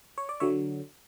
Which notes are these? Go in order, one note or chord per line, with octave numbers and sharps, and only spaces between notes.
C#5
D5
D3 F#3 C#5 E5